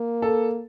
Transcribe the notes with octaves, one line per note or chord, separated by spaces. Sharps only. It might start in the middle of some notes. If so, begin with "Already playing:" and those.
Already playing: A#3
A4